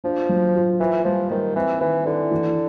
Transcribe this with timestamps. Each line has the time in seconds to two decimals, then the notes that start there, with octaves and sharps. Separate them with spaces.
0.04 F3 D4
0.29 F#3
0.55 F4
0.80 E3 F4
1.04 F3 G3
1.30 D#3 G3
1.56 E3 C4
1.81 D#3 E3
2.05 D3 E4
2.31 E3